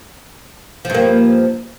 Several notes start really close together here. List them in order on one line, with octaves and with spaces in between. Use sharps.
F3 G2 A#3